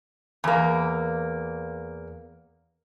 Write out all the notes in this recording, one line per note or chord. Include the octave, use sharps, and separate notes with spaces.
E2 A#3